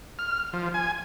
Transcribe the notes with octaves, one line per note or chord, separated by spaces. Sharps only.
F6
F3
G#5